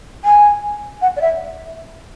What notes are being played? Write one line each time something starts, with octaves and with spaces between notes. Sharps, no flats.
G#5
F#5
D5
E5